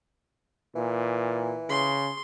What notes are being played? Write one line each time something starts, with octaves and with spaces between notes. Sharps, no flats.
A#2 E3
C#3 C6